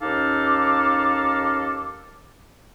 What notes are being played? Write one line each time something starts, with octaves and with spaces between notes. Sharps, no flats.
D#2 C#4 D#4 A4 F5 D6